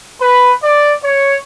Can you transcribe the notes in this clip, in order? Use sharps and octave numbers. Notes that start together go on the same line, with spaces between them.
B4
D5
C#5